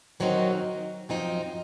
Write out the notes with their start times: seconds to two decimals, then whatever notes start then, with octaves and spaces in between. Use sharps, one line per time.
0.20 D#3 F#3 C4 D#4 F#4
1.09 F#2 F3 C4 D#4